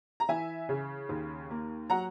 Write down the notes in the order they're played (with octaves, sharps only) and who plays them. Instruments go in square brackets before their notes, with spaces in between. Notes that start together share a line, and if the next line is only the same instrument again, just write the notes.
[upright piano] A#5
E3 E5 G#5
C#3
D#2
A#3
F#3 F#5 A#5